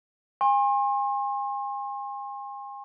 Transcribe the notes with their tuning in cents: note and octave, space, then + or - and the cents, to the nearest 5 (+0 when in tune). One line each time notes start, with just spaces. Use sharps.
G#5 -40 C6 +45